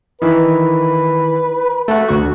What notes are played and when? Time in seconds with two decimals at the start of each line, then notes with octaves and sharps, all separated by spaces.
0.22 D#3 E3 B4
1.88 A3 F#4
2.08 D2 F#4